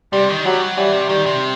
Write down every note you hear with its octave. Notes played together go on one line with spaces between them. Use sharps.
C3 G3
D#3
F#3 G3
F#3
E3 G3
C3
D#3 G3
C3